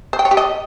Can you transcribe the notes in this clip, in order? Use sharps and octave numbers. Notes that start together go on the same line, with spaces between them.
C5
G5
C#5
G4
D#5